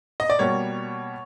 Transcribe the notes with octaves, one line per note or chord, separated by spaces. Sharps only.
D#5
D5
B2 G3 A#3 C#5